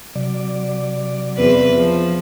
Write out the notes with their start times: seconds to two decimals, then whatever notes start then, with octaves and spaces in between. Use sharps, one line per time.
0.15 C3 F#3 D5
1.37 E2 C4 B4
1.76 F3